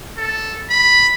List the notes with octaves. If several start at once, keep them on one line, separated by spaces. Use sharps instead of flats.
A4
B5